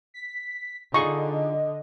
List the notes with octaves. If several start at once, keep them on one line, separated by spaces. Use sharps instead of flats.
B6
D3 D#4 F4 G#4 D#5 C#6